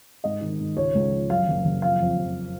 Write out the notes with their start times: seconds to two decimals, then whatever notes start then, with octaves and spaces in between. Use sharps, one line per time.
0.24 G#2 D#5
0.41 D#3
0.60 G#2
0.77 C#2 C#5
0.95 C#2
1.12 F3
1.30 F#2 F5
1.48 F#1
1.65 F#1
1.82 F3 F5
2.01 F2
2.18 F2